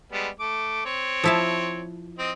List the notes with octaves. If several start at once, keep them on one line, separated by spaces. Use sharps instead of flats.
G3 G#3 B3
A3 D6
C4 C#5
F3 E4 A5
C4 D#5